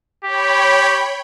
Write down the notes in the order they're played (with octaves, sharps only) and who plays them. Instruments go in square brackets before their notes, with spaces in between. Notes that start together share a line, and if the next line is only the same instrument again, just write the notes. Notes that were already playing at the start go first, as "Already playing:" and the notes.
[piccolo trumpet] G4 [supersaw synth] C#5 G5 B5